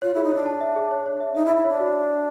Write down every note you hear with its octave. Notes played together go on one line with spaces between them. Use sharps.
F4 C#5
E4 G#4
D#4
D4 C#5
A5
E5
G#4
C#5
C#5
E5
D#4 E5
E4
E5
E4
D4 C#5
F#4